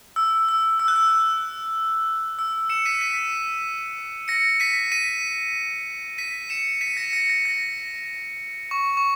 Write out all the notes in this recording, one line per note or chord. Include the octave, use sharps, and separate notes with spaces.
E6
E6
E6
F#6
E6
E6
C#7 E7
B6 D#7
B6 D#7
A#6 C#7
B6 D#7
B6 D#7
B6 D#7
C#7 E7
B6 D#7
A#6 C#7
A#6 C#7
A#6
A#6
C#6
C#6